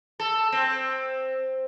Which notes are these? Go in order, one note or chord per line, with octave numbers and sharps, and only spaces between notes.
A4
C4